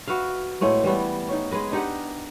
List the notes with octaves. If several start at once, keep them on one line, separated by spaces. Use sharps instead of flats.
F#4 B4 E5 F5
A2 G#3 A3 B3
E3 G3 A3 B3
C#4 D#4
G#3 G#4 B4 D#5
D4 D#4 G4 F#5